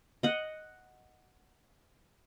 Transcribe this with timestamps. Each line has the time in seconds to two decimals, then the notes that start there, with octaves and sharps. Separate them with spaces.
0.23 D#5 F#5